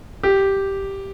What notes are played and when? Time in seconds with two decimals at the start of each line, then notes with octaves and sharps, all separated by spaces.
0.23 G4